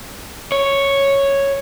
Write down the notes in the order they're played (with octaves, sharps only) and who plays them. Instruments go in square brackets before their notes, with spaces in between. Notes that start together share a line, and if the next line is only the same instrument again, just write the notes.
[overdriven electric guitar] C#5